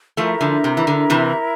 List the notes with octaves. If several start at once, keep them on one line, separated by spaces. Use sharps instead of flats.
F3 A3 E4 A#4 E5 A#5
D3 F3
C3
E3
D3
C3 E3